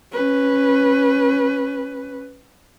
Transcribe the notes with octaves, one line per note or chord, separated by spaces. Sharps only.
C#4 B4